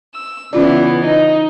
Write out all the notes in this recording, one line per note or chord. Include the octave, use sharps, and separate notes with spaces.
E6
C#3 E3 B3 C#4 F4 D5
D#4